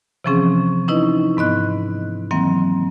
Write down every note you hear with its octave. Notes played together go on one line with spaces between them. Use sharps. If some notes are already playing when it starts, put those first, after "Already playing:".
C3 E3 F3 C4 C#4 G#4
C#4 D#4 E4 B4 D#5
G#2 B3 D#5 F#6
D#3 E3 F#3 A#3 C4